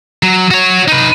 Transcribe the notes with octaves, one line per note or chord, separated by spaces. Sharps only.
F#3
F#4 C#5
D#4 B4